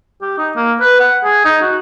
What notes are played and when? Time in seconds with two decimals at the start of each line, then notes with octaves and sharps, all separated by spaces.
0.22 G4
0.38 D#4
0.56 A#3
0.80 B4
1.00 F#5
1.24 G#4
1.45 D#4
1.62 F#4